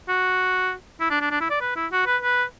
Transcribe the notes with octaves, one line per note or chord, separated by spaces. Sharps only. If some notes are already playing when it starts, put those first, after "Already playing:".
F#4
E4
D4
D4
D4
E4
D5
B4
E4
F#4
B4
B4